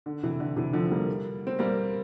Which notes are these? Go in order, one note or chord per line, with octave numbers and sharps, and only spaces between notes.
D3
C3 E3
D3
C3 E3
D3 F3
G3 A#3
C4
G3 A#3